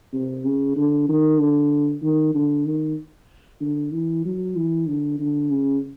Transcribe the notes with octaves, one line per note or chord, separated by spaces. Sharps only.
C3
C#3
D3
D#3
D3
D#3
D3
D#3
D3
E3
F#3
E3
D3
D3
C#3